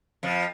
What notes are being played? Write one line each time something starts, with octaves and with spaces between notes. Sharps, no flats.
F2 F3